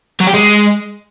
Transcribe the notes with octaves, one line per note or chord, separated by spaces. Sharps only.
F#3
G4
G#3